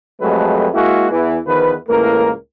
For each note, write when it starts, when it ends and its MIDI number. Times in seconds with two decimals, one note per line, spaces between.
0.21 0.67 41
0.21 0.67 54
0.21 0.67 56
0.21 0.67 57
0.21 0.67 67
0.21 0.67 71
0.74 1.11 56
0.74 1.11 58
0.74 1.11 64
0.74 1.11 66
0.74 1.11 68
1.11 1.38 40
1.11 1.38 52
1.46 1.73 40
1.46 1.73 51
1.46 1.73 53
1.46 1.73 71
1.88 2.31 37
1.88 2.31 45
1.88 2.31 52
1.88 2.31 58
1.88 2.31 70